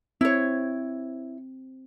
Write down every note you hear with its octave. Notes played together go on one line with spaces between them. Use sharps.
C4 E4 C#5